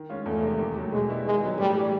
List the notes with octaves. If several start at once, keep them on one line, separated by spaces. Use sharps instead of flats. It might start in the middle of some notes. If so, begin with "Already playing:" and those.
Already playing: D#3
G#3 C#4 F4
E2 A3
C3 D#3 G#3
D#2
D#3 F#3 A3
B2 G#3
G3 B3 E4
D#3 G#3
F#3 B3
A2 G3
E3 G3